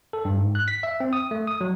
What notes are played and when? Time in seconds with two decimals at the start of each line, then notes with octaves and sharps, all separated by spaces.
0.13 A4
0.25 G2
0.37 G#2
0.55 F#6
0.68 B6
0.83 E5
1.00 C4
1.13 D#6
1.31 A3
1.47 D#6
1.61 F#3